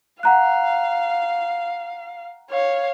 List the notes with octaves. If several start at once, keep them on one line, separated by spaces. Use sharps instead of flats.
F5 F#5 A#5 F#6
C#5 F5